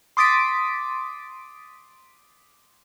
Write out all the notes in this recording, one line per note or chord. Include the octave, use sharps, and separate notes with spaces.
C6 D6 D#6 A6 B6 D7